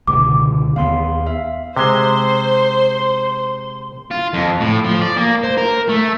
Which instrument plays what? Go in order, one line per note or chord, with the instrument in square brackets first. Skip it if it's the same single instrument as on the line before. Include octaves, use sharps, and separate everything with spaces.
[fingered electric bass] C#2 B2 D3 [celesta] D6
[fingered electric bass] D#2 B3 [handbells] F5 C6
[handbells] E5 F5
[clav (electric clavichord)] C3 G#3 [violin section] C5 [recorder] C6
[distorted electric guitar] F4
F2
A2
F3
D5
A#3
C5
A#4
A3